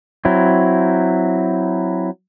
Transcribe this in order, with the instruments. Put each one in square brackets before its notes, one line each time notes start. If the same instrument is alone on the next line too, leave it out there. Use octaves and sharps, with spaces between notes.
[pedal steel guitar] F#3 C4 E4